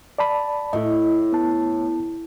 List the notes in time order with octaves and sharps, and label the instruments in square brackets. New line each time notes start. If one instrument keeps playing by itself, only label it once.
[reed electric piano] D5 A5 B5
[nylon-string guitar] A2 [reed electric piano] E4 D#5
[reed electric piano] B3 A5